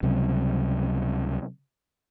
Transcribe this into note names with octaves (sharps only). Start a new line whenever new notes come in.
C#2 C3 F#3 G3